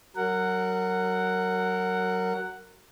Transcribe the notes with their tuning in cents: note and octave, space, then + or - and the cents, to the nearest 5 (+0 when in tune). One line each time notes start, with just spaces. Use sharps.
F#3 +20 A#4 -20 F#5 +5